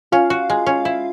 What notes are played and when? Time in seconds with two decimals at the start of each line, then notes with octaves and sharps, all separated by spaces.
0.12 C#4 F4 F5
0.30 F#4
0.50 G#3
0.66 C#4
0.85 E4